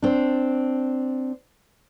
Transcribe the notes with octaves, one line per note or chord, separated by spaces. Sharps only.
C4 D4